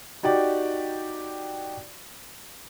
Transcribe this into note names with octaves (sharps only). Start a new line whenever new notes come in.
D#4 F#4 G4 D5